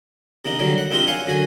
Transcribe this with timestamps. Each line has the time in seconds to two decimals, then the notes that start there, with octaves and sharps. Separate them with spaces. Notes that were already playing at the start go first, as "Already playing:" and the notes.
0.45 C3 A#3 D4 D#4
0.59 D3 D#3 F#3 G3 A#3
0.78 F#5
0.91 A#3 C4 D4 D#4 F4 G4
1.07 C#5 F5 F#5 G#5
1.26 F#2 D3 F#4 G#5